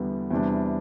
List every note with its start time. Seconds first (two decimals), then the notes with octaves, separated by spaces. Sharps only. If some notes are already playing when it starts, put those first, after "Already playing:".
Already playing: E2 D3 G3 B3
0.31 E2 C3 G3 D4